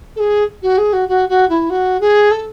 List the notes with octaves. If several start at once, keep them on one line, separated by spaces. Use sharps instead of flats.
A4
G#4
F#4
G#4
F#4
F#4
F#4
E4
F#4
G#4
A4